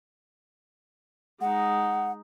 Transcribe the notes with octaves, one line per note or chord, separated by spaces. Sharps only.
G#3 D#4 F#5